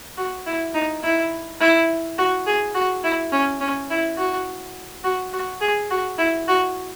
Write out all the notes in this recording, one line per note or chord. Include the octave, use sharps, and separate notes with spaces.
F#4
E4
D#4
E4
E4
F#4
G#4
F#4
E4
C#4
C#4
E4
F#4
F#4
F#4
G#4
F#4
E4
F#4